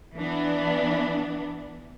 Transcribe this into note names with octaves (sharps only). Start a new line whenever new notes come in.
E3 B3 D4